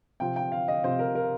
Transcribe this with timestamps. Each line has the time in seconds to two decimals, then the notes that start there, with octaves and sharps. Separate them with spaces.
0.20 C3 F3 C4 G5
0.36 G5
0.52 F5
0.68 D#5
0.83 C3 F3 C4 C5
0.99 A#4
1.15 A#4